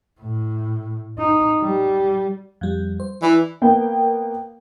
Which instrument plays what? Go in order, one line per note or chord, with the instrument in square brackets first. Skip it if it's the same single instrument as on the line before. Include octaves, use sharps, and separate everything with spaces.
[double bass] A2
D#4
G3
[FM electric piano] F2 G3
C5
[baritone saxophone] E3 [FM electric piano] D5
[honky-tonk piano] A#3 B3 G5